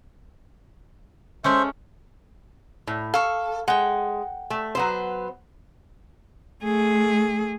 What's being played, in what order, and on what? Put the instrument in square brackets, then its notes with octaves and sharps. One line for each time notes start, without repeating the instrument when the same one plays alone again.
[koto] G#3 A3 C#4 [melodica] C5 E5
[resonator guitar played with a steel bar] A2
[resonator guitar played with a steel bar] A4 [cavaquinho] F5 C#6
[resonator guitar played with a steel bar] G#3 [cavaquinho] F#5 G5
[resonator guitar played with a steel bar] A3
F#3 B3 C5
[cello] A3 G#4